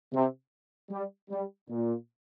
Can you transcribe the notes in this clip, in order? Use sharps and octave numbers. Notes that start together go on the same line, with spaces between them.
C3
G3
G3
A#2